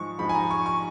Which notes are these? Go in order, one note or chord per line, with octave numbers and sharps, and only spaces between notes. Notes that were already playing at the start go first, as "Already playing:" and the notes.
Already playing: G#2 F3 G#3 C#6
G#2 F3 G#3 B5
G#5
A#5
C#6
C#6